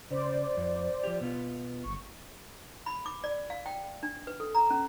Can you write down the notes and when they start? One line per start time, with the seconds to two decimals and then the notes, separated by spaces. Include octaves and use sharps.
0.11 C#3 C5 D5
0.57 F2
1.04 F3 G4
1.21 B2 B3 F4
1.83 G1 C#6
2.86 B5
3.06 D6
3.24 D5
3.50 F5
3.66 G5
4.03 D4
4.27 B4
4.40 A4
4.55 A#5
4.70 C#4